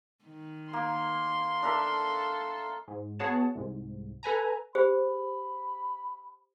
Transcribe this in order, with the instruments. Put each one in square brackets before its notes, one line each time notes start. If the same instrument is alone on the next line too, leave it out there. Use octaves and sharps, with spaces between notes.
[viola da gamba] D#3
[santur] A#3 [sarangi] C6
[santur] D4 A#4 E5 [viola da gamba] A4
[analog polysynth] G#2
B3 F#4 G#4 C#5 F#5 A5
C2 G#2
A4 B4 G#5 A#5
[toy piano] G4 G#4 C5 [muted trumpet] B5